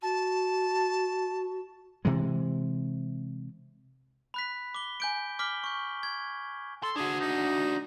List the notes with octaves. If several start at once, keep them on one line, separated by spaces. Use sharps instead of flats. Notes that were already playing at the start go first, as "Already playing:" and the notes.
F#4 A5
C3 E3 G#3
B5 F#6 B6
D6 G7
G#5 G6 D7
D6 F6 B6 F#7 G7
C#6 G6
G#6
A4 C6
D4 F#4 G#4
D#4